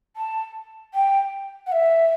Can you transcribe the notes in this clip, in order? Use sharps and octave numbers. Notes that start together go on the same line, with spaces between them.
A5
G5
F#5
E5